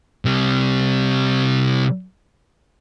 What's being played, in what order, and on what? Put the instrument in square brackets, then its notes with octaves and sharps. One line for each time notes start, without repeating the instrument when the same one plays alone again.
[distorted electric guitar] C3 G3